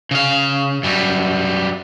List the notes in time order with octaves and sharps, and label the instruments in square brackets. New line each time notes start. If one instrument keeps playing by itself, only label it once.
[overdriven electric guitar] C#3 F5
F#2 G3